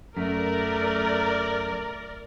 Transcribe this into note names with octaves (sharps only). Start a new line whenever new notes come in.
F#2 A3 A#4 D5